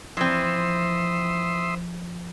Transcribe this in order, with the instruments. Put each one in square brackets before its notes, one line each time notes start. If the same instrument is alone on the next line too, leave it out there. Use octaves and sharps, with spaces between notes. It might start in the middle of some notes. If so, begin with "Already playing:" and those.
[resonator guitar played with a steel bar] E3 C4 [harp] F3 [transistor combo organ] E5 C6 D#6